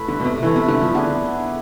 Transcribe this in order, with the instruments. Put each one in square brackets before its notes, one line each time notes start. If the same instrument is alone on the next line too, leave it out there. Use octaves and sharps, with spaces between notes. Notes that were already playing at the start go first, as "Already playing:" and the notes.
Already playing: [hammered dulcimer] A3 E4 B4
[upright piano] D3
B2
C3
[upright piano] E3 [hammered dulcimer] A3 E4 B4
[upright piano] C3
D3
F3
[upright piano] D3 [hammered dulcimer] B3 D4 G#4